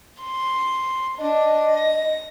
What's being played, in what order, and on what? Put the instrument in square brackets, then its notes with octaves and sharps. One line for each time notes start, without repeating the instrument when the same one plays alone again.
[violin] C6
[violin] D4 [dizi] D#5
[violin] A#6